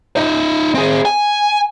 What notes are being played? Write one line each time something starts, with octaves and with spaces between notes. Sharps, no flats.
D#4 E5
C4 G#4
G#5